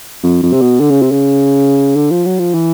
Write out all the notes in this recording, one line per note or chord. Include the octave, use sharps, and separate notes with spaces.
F2
F2
C3
B2
D3
C#3
C3
C#3
D3
F3
F#3
F3
E3